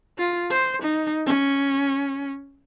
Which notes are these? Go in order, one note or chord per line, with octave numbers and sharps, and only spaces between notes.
F4
C5
D#4
C#4